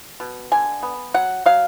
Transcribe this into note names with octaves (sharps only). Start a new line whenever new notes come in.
B2
D3 G#5
B3
F#3 F#5
F#3 F5